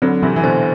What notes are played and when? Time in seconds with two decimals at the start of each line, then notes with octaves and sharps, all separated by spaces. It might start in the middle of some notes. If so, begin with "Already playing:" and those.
0.02 D3 F#3 C4
0.23 C3 E3 C4
0.36 E3
0.43 B2 D3 C5